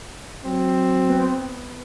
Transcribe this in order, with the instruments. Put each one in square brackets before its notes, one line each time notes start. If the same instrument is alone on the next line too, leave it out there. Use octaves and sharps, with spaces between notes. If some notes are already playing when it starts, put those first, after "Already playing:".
[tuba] F#3 [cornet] C4
[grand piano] B3